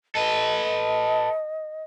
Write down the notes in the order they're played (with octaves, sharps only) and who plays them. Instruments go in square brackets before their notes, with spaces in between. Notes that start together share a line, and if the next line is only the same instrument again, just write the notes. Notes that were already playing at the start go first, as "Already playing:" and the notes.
[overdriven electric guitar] A4 B4 [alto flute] D#5